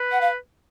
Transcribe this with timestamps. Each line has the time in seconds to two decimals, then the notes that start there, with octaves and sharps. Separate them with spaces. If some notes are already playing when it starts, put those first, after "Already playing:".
Already playing: B4
0.12 F#5
0.21 F5